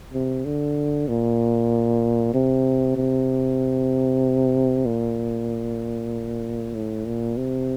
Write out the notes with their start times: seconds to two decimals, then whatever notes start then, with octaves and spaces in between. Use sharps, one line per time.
0.13 C3
0.45 D3
1.08 A#2
2.34 C3
2.96 C3
4.85 A#2
6.75 A2
7.06 A#2
7.37 C3